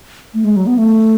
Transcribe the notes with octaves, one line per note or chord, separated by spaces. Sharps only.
A3
G#3
F#3
B3
A3